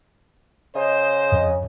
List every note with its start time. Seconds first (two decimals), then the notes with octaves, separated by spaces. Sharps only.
0.75 C#3 C5 D#5
1.32 F2